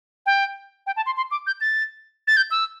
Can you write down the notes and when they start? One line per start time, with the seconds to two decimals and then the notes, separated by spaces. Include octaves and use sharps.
0.26 G5
0.87 G5
0.96 A5
1.06 C6
1.17 C6
1.31 D6
1.47 G6
1.61 A6
2.27 A6
2.37 G6
2.51 E6